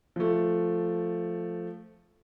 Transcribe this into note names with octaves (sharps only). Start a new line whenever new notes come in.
F3 A3